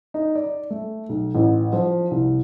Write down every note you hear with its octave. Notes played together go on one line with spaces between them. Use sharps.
D#4
D5
A3
B1
A1
F3
C2